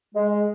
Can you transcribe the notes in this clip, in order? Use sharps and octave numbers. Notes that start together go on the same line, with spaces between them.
G#3